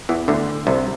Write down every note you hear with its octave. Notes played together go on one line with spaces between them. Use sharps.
E2 E3
D2 D3
C2 C3